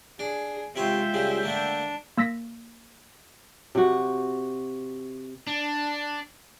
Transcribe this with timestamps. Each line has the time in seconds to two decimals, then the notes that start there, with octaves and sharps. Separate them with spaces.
0.19 D4 G#4
0.76 C3 G#3 F4 C#5 E5 G5
1.14 C#2 C#3 G3
1.43 D3 A3 A#3 D4
2.18 A#3 E6 A#6 B6
3.75 C3 F#4
5.47 D4